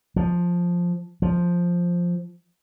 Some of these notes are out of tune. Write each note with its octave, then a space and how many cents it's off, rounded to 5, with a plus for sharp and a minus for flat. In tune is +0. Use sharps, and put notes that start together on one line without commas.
F3 +5
F3 +5